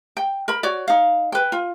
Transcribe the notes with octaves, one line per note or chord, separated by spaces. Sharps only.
G5
A#4 B5
F#4 C#5 D5
D#4 F5
B4 G5
F4